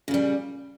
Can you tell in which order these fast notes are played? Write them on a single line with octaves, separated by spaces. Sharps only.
C#3 A#2 G3